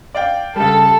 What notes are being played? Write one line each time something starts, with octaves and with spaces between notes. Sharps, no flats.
D5 F5 G5
C#3 G3 A4